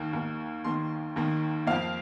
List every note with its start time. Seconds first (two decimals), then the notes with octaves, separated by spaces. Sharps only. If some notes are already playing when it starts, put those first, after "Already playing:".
Already playing: D#2 D#3 A#3
0.13 D#2 D#3 A#3
0.64 D#2 D#3 A#3 C6
1.16 D#2 D#3 A#3
1.67 F2 F3 A#3 F5